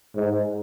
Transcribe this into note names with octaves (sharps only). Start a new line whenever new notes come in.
G#2